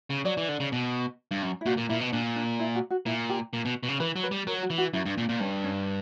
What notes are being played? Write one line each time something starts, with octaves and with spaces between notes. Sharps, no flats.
C#3
F#3 D5
E3
D3
C#3
B2
G2
F#2
E4
A#2 F#4
A#2
A#2 E4
B2
A#2 D4
D4
E4
F#4
F#4
A#2 E4
G4
A#2
B2
B2
C#3
E3 B4
F#3
B4
G3
F#3 A#4
F#4
E3
F#4
F#2 E4
G2
A#2 D4
A#2
G2 C#4
C#4